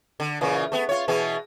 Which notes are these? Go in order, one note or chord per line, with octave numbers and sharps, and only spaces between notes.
D3
A#2 C#3 E3
A3 B3
F4 C#5
B2 E3 G#4